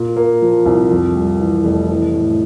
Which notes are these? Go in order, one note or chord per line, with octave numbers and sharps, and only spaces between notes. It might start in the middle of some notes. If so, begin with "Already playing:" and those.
Already playing: A#2
A#3
F3
C2
F2
G3
E3
F1
E3
A2